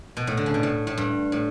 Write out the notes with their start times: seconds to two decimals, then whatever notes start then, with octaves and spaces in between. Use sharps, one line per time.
0.17 B2
0.27 A2
0.37 D3
0.46 C#3
0.54 B2
0.63 A2
0.87 A2
0.98 G2
1.32 A2